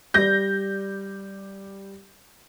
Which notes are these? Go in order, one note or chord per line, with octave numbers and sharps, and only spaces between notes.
G3 G4 D5 G6 A#6